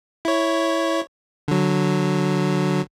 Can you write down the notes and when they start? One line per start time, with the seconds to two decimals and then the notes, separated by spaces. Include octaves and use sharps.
0.25 E4 C#5
1.48 D3 F#3